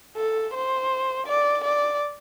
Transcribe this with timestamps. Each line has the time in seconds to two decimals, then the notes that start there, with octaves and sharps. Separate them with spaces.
0.17 A4
0.54 C5
1.27 D5
1.64 D5